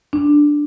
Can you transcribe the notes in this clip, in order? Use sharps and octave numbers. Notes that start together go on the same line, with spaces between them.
D4